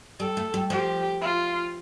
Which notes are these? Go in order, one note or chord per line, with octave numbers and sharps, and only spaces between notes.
G3 A4
A3
G3
F3 G4
F4